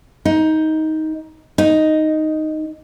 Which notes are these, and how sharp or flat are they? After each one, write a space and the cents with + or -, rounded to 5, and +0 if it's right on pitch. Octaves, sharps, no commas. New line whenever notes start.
D#4 +15
D#4 +0